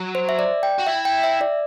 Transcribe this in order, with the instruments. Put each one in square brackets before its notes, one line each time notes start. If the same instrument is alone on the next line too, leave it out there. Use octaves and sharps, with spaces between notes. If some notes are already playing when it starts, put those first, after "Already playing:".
Already playing: [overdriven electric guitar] F#3
[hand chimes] C5
E5
D5
G5
[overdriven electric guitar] F#4
[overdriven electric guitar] E4 [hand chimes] E5
[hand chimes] G5
E5
D5